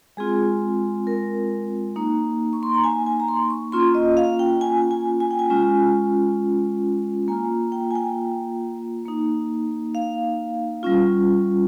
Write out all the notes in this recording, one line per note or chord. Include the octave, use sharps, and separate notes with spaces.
G#3 C4 F4 G#4
A#4
A#3 D#4
C#6
C6
A#5
G#5
G#5
A#5
C6
C#6
A#3 C#4 F4 C6
D#5
F5
G5
G#5
G#5
G#5
G5
G#5
G#3 C#4 F4
A#3 G#5
F4
G5
G#5
G5
A#3 D#4
F5
G3 C#4 F4